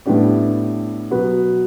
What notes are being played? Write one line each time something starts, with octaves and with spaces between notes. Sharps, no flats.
A2 G3 B3 D4 G4
B2 F#3 B3 F#4 B4